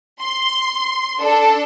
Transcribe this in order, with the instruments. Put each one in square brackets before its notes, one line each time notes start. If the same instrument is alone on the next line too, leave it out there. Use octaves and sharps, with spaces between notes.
[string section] C6
D4 A4